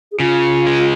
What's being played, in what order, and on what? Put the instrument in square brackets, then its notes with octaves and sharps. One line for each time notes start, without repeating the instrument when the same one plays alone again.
[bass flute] G#4
[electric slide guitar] C#3 [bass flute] F4
[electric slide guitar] G#3